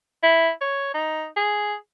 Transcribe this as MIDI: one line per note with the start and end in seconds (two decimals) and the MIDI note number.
0.23 0.50 64
0.61 0.90 73
0.94 1.26 63
1.36 1.74 68